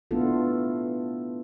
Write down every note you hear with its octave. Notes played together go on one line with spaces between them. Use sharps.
A3 B3 D4 E4 F4 A4